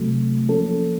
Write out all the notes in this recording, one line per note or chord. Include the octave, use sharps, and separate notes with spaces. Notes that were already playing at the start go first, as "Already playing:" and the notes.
Already playing: C3 F#3 A3
F3 A#3 C#4 A4